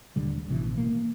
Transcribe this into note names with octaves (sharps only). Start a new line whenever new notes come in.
D#1 D3 G3
A1 B2 E3
A#3